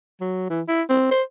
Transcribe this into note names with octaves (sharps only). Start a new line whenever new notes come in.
F#3
E3
E4
C4
C5